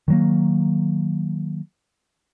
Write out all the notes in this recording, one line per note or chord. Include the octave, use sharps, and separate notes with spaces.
D#3 F#3 A#3